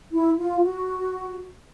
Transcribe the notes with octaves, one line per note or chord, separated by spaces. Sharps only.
E4
F4
F#4